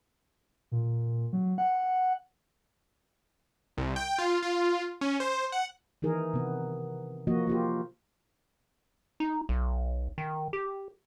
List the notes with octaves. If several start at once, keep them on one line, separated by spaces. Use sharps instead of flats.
A#2
F#3
F#5
C2
G5
F4
F4
C#4
C5
F#5
D#3 E3 D#4 G#4 A#4
C3 B3
F3 A#3 F#4 D#5
A#3 F4 G4
D#4
B1
D#3
G4